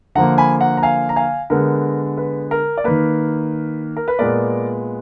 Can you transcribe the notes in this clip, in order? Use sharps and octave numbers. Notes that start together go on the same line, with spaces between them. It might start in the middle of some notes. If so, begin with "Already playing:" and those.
D3 F3 A#3 F#5 A#5
G#5 B5
F#5 A#5
A#5
F5 G#5
A#5
F5 G#5
D3 G#3 B3 A#4
B4
A#4
D5
D#3 A#3 B4
A#4
B4
A#2 G#3 B3 A#4 D5